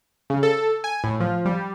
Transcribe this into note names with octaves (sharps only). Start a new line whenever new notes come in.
C#3
A4
G#5
A2
F3
G3